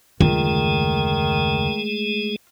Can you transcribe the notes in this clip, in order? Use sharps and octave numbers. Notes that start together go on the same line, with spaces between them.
F#1 D#2 D3 D#3 G#3 A3 F4 G#4